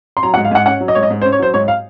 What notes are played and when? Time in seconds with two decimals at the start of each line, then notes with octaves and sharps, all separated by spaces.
0.17 C6
0.23 F#3 A#5
0.34 F#5
0.37 G#2
0.45 F5
0.51 G#2 F#5
0.66 C#4 F#5
0.80 F#3
0.88 D#5
0.95 G#2 C#5
1.03 D#5
1.10 G#2
1.22 C5
1.25 C#4
1.32 C#5
1.39 F#3 C5
1.54 G#2 C#5
1.68 F5